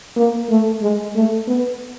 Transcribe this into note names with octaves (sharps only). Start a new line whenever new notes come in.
A#3
A3
G#3
A3
B3